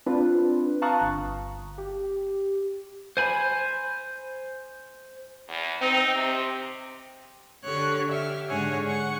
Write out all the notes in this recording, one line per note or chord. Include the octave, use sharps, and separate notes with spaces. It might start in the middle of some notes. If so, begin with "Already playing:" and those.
C4 D4 F4 B4
F5 A5 A#5 C#6 D#6 F#6
G1
G4
C5 G#5 B5
E2
C4 D#4
C3
D3 G4 A4 C#5 F#6
G4 E5 F6
G#2 D3 G#4 C#5 F#5 G#5
F#5 C#6